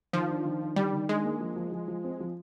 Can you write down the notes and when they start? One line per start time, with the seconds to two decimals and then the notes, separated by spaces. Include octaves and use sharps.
0.13 D#3 F3
0.29 D4
0.45 D#3
0.61 D4
0.76 D#3 G3
0.93 D#3
1.09 G#3 D4
1.24 A#3
1.40 F3
1.56 F3
1.72 F3
1.88 F3
2.04 C4
2.20 F3